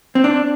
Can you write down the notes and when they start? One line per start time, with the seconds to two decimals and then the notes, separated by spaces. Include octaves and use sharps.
0.15 C4
0.24 D4